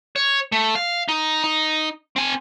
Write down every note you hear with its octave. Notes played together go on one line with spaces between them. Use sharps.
C#5
A3
F5
D#4
D#4
C4 G#5